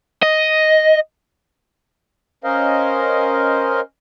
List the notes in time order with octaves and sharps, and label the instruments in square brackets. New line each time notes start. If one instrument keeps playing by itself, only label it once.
[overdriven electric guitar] D#5
[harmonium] C#4 A#4 C5 D#5 F5